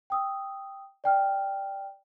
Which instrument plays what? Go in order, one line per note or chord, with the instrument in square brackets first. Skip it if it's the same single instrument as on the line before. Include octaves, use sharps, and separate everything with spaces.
[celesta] G5 D#6 E6
D5 G5 F6